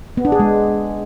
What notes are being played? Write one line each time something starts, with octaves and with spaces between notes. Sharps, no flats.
B3
D4
G#4
G#3